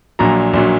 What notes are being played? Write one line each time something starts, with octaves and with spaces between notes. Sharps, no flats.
A#1 A#2 F#3 A#5
A#1 A#2 F#3